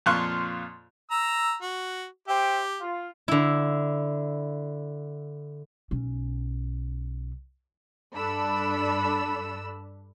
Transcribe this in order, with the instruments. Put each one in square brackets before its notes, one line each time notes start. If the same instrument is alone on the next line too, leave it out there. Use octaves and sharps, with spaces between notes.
[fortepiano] F2 A#2 F4 C6 C#6 F#6
[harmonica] A#5 E6
F#4
[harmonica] G4 [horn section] C5 E5 G5
[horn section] F4
[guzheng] D3 E4
[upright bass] B1 C#4
[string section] G2 D4 A4 B5 E6